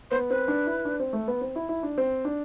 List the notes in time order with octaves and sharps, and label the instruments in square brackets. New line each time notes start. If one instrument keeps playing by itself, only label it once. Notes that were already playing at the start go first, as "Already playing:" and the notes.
[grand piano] B3 [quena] C5
[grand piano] C4 [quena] B4
[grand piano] D4
E4
D4
C4
A3
B3
C4
E4
E4
D4
C4
D4